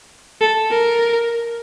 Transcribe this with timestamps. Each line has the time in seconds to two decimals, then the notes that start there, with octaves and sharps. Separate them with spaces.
0.41 A4
0.71 A#4